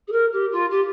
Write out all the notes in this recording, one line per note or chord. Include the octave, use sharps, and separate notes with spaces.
G#4
A#4
G4
F4
G4